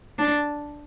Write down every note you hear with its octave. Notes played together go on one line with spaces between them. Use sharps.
D4